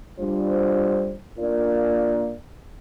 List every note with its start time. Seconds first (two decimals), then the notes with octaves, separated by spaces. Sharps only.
0.18 G3 D4 F4 C5
1.37 A#3 D4 F4 A#4 D5